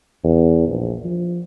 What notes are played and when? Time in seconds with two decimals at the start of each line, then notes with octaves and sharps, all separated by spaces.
0.23 E2
0.68 A#1
1.05 F3